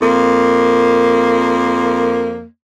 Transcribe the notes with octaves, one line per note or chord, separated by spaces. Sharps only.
F2 A#3